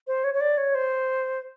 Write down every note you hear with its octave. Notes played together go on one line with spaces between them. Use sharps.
C5
C#5
C#5
D5
C#5
C5